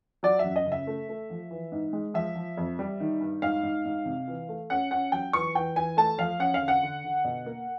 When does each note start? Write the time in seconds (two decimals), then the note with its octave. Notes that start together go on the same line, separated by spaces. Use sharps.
0.23 F#3 D5
0.39 E5
0.44 F#2
0.56 D#5
0.66 C#3
0.72 E5
0.87 A3
1.09 A3
1.30 F3
1.51 E3
1.72 G#2
1.93 G#3
2.14 F3 E5
2.35 F3
2.57 F2
2.79 G3
3.00 D#3
3.21 G2
3.42 G#2 F5
3.63 G#2
3.85 G#2
4.05 C3
4.28 E3
4.49 A3
4.70 C#4 F#5
4.91 C#4 F#5
5.12 F#3 G5
5.33 E3 C#6
5.55 E3 G5
5.76 E3 G#5
5.97 A3 A5
6.18 F3 F5
6.39 C#4 F#5
6.54 F5
6.61 D3
6.68 F#5
6.83 D3
7.04 D3
7.24 B2
7.46 A#3